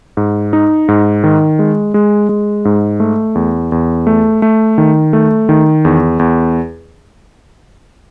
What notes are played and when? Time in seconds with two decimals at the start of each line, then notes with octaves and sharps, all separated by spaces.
0.17 G#2
0.53 D#4
0.88 G#2
1.24 D#3
1.59 G#3
1.94 G#3
2.29 G#3
2.65 G#2
3.00 A3
3.35 E2
3.72 E2
4.07 A3
4.42 A3
4.78 D#3
5.13 A3
5.49 D#3
5.85 E2
6.19 E2